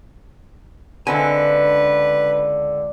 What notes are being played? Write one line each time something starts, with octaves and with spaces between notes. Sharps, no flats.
C#2 D3 C4 B4 G#5